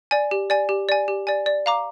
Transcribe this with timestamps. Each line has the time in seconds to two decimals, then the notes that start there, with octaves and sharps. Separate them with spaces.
0.11 D5 G#5
0.31 G4
0.50 D5 G#5
0.69 G4
0.89 D5 G#5
1.08 G4
1.27 D5 G#5
1.46 D5
1.66 F5 A#5 D6